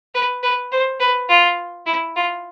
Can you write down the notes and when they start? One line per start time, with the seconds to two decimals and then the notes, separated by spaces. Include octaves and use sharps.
0.15 B4
0.43 B4
0.72 C5
1.00 B4
1.29 F4
1.86 E4
2.16 F4